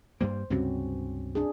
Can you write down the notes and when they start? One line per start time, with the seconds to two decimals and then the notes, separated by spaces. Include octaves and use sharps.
0.21 G2 G3 A#3 C5
0.50 C#2 G2 C3 C4 C#4 F#4
1.35 D4 G#4